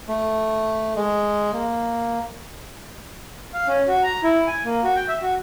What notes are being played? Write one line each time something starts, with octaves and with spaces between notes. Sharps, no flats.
A3
G#3
A#3
F5
C#4
F#4
A#5
E4
G#5
A#3
F#4
G5
E5
F#4